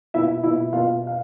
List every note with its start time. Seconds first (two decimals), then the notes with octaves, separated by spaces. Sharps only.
0.14 B2 E4 E5
0.44 B2 E4 E5
0.73 B2 F4 F5
1.07 F5